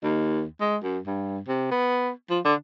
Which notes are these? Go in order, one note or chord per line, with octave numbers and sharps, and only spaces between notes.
D#2
G#3
F#2
G2
C3
B3
F3
D3